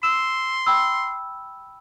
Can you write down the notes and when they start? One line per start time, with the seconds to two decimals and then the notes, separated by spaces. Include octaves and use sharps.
0.03 C6 E6 E7
0.66 G5 B5 E6